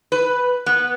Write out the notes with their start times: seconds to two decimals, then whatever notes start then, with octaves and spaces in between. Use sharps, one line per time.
0.12 B4
0.66 B3